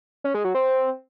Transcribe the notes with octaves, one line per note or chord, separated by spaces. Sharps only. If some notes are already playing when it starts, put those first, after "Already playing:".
C#4
G#3
F#3
C4